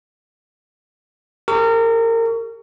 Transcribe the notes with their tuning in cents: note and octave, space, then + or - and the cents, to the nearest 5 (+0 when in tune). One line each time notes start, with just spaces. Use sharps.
G4 +45 A#4 -30 C#6 +25